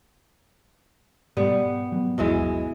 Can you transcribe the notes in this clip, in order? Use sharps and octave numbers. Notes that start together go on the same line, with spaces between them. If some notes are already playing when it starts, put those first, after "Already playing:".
G#2 B2 G3 B3
F#3 A#3 B3
G1 D#2 B2 E3 F#3 G#3